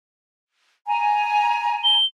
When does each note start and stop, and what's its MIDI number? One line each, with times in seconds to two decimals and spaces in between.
0.87 1.97 80
0.87 1.97 82
1.84 2.05 103